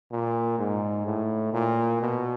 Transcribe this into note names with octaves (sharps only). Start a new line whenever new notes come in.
A#2
G#2
A2
A#2
B2